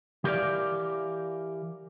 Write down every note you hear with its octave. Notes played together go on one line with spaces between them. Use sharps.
E3 G4 A#4 D5 F5